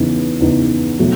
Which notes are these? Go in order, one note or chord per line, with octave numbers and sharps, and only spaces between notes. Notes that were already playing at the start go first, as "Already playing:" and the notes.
Already playing: E2 C#3 E3 B3 D#4
E2 C#3 E3 B3 D#4
B2 F#3 A3